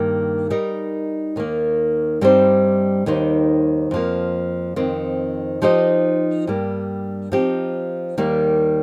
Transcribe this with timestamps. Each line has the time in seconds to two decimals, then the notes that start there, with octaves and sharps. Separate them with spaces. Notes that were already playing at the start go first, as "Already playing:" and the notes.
Already playing: G2 D#3 A#3
0.50 G3 D#4 A#4 D#5
1.36 D#2 D#3 A#3
2.21 G2 G3 C4 D#4 C5
3.06 D#2 D#3 G3 D#4 C5
3.91 F2 F3 A#3
4.76 F2 D#3 C4
5.62 F3 D#4 G4 C5 D#5
6.47 G2 G3 A#3
7.32 F3 C4 D#4 G4
8.18 D#2 D#3 G3 A#3